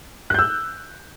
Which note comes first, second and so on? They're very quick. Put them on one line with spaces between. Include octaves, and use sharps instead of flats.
F#6 G6 E6